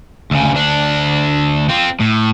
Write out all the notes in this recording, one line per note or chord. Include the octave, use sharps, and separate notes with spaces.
D2 C#3
D2 D4
C4 F4
A2